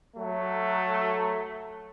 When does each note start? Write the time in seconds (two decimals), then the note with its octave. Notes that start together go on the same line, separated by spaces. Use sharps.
0.17 F#3 A3